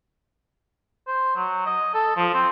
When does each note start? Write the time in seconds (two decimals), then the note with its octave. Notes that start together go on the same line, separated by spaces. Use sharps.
1.07 C5
1.36 F#3
1.66 D#5
1.94 A4
2.16 F3
2.34 C4